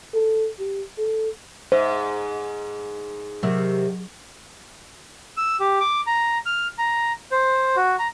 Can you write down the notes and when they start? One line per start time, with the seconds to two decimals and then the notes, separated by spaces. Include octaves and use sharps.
0.14 A4
0.59 G4
0.98 A4
1.72 G#2 C5 E5
3.43 C3 D#3 F#3
5.37 E6
5.60 G4
5.80 D6
6.07 A#5
6.46 F6
6.78 A#5
7.32 C5
7.76 F#4
7.99 A#5